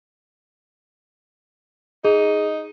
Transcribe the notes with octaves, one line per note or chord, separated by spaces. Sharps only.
D#4 G#4